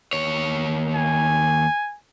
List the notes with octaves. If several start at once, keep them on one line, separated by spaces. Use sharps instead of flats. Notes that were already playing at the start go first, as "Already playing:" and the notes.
D#2 C#5
G#5